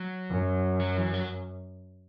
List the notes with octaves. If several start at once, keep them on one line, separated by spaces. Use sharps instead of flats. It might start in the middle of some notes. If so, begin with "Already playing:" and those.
Already playing: F#3
F#2
F#3
E3
F#3